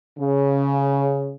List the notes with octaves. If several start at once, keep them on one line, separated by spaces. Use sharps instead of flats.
C#3